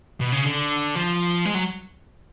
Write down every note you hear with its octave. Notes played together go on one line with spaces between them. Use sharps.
B2
C#3
D3
F3
G#3
F#3